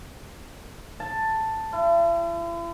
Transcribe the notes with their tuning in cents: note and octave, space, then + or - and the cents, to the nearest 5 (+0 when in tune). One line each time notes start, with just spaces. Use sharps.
A5 +5
E4 +45